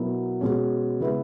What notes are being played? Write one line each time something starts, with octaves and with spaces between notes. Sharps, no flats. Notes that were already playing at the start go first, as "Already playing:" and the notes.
Already playing: B2 F#3 B3 E4 A#4
B2 G#3 C#4
C#3 G#3 B3 E4 B4